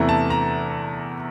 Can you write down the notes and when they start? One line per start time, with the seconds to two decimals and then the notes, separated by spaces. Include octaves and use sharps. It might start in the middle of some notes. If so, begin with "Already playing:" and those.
Already playing: E2 C3 E3 A3 A#5
0.09 A5
0.30 A#5